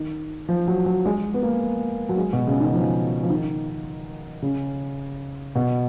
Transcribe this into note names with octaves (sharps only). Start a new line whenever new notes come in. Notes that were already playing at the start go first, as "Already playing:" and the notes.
Already playing: D#3
F3
F#3
F#3
G#3
B3
A#3
F#3
G#3
B2
C#3
D#3
F3
F3
D#3
C#3
B2